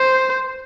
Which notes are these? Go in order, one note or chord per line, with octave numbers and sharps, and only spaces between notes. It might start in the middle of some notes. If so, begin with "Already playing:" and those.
Already playing: C5